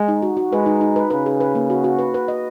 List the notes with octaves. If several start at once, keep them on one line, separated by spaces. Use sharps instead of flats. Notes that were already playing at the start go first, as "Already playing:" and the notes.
Already playing: G#3
D#4
F#4
F#4
G#3 B4
D#4
D#4
B4
C#3 B4
G#4
B4
A#3
F#4
F#4
B4
B4
D#5